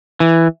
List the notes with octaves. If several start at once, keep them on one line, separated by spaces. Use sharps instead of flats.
E3